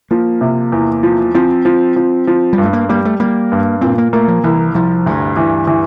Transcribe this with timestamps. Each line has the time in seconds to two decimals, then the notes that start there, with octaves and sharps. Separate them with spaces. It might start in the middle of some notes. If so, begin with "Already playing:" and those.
0.11 F3 A#3
0.41 C3
0.72 E2
1.03 F3
1.34 F3 C4
1.65 F3
1.96 F3
2.27 F3
2.53 G3
2.58 G2
2.63 A3
2.73 A#3
2.89 G3 A#3
3.05 A3
3.20 G3 A#3
3.52 G2
3.81 A#2 C4
3.98 A#3
4.13 A3 A#3
4.28 F3
4.43 C2 E3
4.74 C2 F3
5.06 D2 G2
5.37 E3
5.67 E3